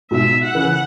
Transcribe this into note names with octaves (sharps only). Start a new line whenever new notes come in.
G#2 B2 E5
F#5
C#3 E3